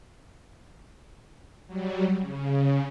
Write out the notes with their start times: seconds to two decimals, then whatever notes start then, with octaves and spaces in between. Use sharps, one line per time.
1.67 F#3 G3
2.21 C#3